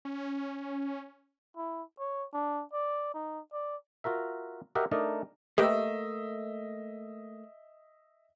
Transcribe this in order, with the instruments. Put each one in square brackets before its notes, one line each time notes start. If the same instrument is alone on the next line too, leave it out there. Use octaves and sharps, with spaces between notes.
[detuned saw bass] C#4
[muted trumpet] E4
C#5
D4
D5
D#4
D5
[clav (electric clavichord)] F4 F#4 A#4 E5
F#4 G4 A#4 D#5 E5 F#5
A3 D4 D#4 A#4 D5 D#5
[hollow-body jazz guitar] A3 A#3 [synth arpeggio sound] G4 A#4 B4 [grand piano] D#5 E5